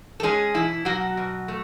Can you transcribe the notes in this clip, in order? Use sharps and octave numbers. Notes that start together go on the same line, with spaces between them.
A4
G#3 C#4 G#4
B2 E3 E4
B2 F#3 F#4
B2
A3